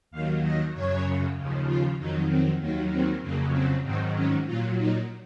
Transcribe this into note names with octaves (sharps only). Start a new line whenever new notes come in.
D#2 D#3 F#3 F5
D#5
F#2 C#3 F#3 C#5
D#2 C#3 F3
F4
F2 D#3 F#3 D#4
C4
D#2 D#3 F#3 A#3
C4
F2 C#3 F#3 A#3
C4
G#2 D#3 F#3 C4
C#4
A#2 F#3 F4
D#4